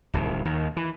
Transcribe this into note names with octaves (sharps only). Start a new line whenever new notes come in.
D1 C2 D#3
D#2 D#3
E3